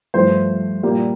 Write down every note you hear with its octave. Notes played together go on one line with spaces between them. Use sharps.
G2 F3 A3 C5
A#2 G3 A#3